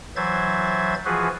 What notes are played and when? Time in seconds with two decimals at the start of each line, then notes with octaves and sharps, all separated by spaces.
0.16 E3 F#3 C5 E5 G#6 A6
1.06 E3 F3 F4 F#4 G#4 B4